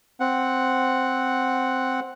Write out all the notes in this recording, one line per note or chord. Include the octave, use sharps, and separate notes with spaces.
C4 F#5